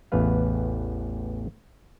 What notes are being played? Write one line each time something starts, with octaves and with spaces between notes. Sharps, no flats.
A1 E2 B3 B4 F5